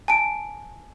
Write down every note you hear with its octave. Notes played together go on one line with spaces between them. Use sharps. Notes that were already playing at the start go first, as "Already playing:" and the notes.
G#5 A5 D7